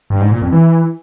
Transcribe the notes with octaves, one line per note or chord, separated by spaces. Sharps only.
G2
G#2
A#2
F2
E3